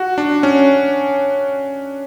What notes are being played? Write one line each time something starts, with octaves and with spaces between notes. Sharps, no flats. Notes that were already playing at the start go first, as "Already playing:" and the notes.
Already playing: F#4
D4
C#4